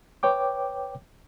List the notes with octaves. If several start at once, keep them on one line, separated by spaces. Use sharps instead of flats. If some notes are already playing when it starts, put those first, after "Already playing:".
B4 C#5 G5 D6